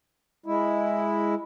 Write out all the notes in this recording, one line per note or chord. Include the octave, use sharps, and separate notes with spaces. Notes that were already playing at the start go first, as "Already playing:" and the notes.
G#3 E4